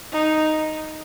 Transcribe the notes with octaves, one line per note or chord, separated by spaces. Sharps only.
D#4